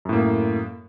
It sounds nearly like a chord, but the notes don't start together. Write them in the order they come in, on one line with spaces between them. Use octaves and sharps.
F#2 A2 A#3